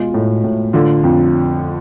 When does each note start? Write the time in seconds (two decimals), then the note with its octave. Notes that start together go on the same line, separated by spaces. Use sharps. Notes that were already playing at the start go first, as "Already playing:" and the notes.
Already playing: B2 G#3 F4
0.14 A2
0.44 A2
0.73 D3 F4
1.04 F2